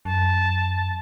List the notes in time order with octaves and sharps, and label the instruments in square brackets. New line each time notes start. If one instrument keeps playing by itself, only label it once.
[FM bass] F#2 [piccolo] A5